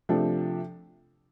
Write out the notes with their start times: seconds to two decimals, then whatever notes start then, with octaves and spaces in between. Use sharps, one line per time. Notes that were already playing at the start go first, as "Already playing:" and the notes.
0.09 C3 F3 A3 D4 A4